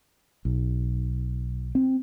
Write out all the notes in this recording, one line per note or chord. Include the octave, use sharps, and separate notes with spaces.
B1
C4